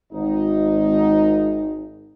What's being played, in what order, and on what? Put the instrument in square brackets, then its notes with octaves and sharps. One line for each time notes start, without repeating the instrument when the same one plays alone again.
[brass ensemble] G#1 D#4